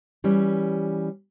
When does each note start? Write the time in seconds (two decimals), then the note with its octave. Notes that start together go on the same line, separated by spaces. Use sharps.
0.24 E3 G3 C#4